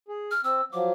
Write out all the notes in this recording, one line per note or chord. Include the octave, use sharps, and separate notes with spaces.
G#4
F6
C4 E6
F3 F#3 D6